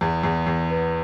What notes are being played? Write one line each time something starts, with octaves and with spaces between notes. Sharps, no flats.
E2
E2
E2
B3